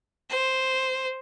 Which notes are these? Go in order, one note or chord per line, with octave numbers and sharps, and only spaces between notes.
C5